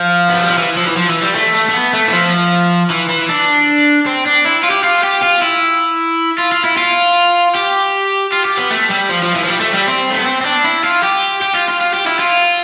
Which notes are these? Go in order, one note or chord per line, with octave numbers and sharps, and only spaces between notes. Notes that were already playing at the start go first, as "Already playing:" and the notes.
Already playing: F3
B3
A3
G3
F3
E3
F3
E3
F3
E3
G3
A3
A3
A3
B3
A3
E3
F3
E3
E3
D4
C4
D4
E4
F4
G4
F4
G4
F4
E4
F4
F4
E4
F4
G4
F4
G4
B3
A3
G3
F3
F3
E3
F3
G3
A3
G3
C4
A3
B3
C4
C4
D4
E4
F4
G4
G4
F4
F4
F4
G4
E4
F4